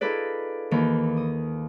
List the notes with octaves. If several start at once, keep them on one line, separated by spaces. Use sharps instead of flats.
D#4 F4 G#4 A4 B4 D5
D#2 D#3 E3
D#6